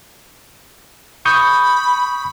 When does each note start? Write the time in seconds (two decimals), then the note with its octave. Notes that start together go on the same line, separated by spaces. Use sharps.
1.25 B5 C#6 D#6 G6